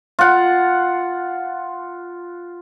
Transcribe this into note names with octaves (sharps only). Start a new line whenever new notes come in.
F4 F#5